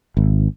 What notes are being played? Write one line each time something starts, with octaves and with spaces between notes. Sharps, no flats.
G#1